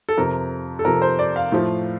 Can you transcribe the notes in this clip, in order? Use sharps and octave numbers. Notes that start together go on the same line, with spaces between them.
A4
F2 C3 F3 A#4
A4
F2 C3 F3 A#4
C5
D5
F5
A2 F3